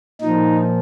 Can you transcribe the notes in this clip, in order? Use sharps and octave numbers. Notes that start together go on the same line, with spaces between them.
A#2 F3 D#4